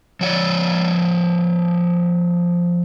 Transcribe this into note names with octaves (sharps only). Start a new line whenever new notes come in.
F3 C#5 D5